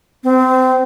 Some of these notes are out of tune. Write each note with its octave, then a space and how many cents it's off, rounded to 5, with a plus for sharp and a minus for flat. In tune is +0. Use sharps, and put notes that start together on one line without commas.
C4 -25